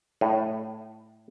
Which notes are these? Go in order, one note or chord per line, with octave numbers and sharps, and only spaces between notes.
A2